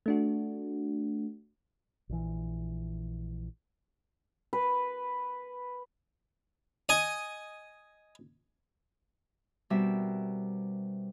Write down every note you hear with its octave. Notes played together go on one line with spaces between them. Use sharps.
A3 D4 F#4
A#1 E3
B4
D#5 G#5
B2 G3 C4 A#4 E5